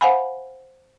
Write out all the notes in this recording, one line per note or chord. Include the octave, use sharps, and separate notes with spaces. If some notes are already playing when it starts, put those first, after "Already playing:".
C5 F5 F#5 G#5 B5